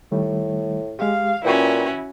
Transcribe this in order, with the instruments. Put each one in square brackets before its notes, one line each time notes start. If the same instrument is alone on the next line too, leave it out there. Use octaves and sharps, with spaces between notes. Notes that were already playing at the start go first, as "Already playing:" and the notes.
[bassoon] A2 [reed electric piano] D#3 G3 A3
[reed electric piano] G#3 G4 [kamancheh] F5
[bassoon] A#2 [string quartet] C#4 F#4 [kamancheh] E4 [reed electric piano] B4 G5 C#6